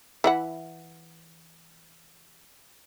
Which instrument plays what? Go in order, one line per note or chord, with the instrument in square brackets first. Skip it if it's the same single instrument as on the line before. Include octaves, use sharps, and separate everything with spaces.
[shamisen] E3 E4 F#5